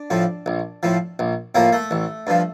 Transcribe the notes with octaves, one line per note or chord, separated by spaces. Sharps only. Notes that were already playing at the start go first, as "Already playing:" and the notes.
Already playing: D4
A2 F3
A#1
A2 F3
A#1
A2 F3 A#3
A3
A1
G2 F3